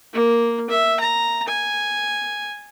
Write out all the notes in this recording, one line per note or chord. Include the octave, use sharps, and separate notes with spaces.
A#3
E5
A#5
G#5